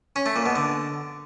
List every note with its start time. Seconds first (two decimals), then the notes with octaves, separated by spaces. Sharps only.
0.16 C#4
0.26 A3
0.36 A#2
0.46 B2
0.56 D3